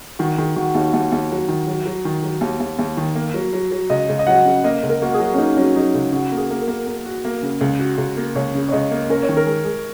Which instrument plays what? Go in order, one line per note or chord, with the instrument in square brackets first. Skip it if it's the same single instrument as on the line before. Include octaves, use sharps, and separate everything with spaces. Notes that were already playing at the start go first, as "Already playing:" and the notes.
[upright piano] D#3 [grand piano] F#4
[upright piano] D#3 [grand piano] G#4
[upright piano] D#3 [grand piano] F#4
[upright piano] D#2 [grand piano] D#4
[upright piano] D#2 [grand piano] F#5
[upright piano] D#2
F#3
D#3
F#3
F#3
D#3
F#3
D#2
D#2
D#2
D#3
A#3
F#3
F#3
F#3
[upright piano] C#2 [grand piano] D#5
[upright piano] C#2
[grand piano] D#5
[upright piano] F#3 [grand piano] F#5
[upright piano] C#3
[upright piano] A#3 [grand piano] D#5
[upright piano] C#2
[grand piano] A#4
[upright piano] A#3 [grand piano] F#4
[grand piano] G#4
[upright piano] F#3
[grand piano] C#4
[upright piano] A#3 [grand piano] D#4
[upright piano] F#3 [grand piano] C#4
[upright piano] F#3 [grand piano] D#4
[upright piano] C#2
[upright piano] C#3 [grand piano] F#4
[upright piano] A#3
[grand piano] G#4
[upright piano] A#3
[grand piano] A#4
[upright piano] A#3
A#3
F#4
A#3
C#3
C#2
F#4
C#2
A#3
[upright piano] C#2 [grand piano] C#5
[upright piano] C#3
[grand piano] C#5
[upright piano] C#2 [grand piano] D#5
[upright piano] A#3
[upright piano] C#4 [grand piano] A#4
[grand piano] C#5
[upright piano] D#3
[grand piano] A#4
[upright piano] G#3
G#3